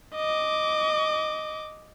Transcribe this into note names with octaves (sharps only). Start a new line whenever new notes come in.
D#5 D6